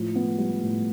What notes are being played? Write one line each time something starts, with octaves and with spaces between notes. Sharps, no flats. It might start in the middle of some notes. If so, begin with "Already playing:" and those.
Already playing: A2 F3
B3
G3
A2